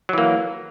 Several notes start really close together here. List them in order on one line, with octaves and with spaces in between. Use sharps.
F#3 E3 A#3